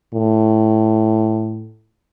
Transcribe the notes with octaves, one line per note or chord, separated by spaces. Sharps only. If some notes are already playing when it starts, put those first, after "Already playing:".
A2